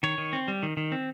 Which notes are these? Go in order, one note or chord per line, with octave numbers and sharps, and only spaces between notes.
D#3 C#5
D#3
C4
G3
D#3
D#3
C4